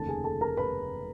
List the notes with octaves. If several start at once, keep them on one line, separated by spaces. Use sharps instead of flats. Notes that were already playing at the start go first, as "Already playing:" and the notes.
Already playing: F1 D#2 C#3 A4 A5
G#4 G#5
A4 A5
A#4 A#5
B4 B5